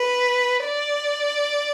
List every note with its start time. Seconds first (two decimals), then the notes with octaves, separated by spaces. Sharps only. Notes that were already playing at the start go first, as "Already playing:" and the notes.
Already playing: B4
0.65 D5